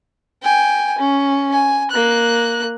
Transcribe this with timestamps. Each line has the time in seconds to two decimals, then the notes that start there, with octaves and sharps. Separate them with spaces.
0.43 G5 G#5
0.98 C#4
1.52 G#5
1.91 A#3 F#6